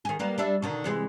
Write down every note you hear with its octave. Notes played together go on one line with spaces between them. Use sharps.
D#3 G#4
G3 A#3 B3
G3 D4 E5
B2 D3 D#3
C3 E3 G#3